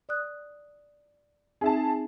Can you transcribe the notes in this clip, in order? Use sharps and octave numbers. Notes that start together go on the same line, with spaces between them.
D5 D#6 F#6
C4 D#4 G#4 E5 A5